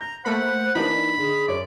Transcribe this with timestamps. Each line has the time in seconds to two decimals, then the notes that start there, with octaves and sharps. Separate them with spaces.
0.01 A#5 G6
0.25 A3 A#3 C5 F#5 B5
0.75 E3 A#3 D4 D#4 B5
1.17 D3 G#4
1.48 F#2 C#5 D5